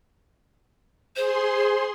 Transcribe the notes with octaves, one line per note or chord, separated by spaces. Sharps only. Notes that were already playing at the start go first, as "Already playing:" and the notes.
G#4 C5 C6